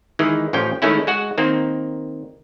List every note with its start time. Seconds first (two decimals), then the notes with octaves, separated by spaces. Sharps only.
0.19 D#3 E3 G#3
0.53 A1 F3 C#4 G5
0.82 D#3 G#3 A3 C#4 E4
1.07 G#3 F#4 F#5
1.38 D#3 A#3 C4